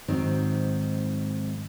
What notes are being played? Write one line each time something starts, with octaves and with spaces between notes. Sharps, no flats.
G#2 D#3 F#3 C4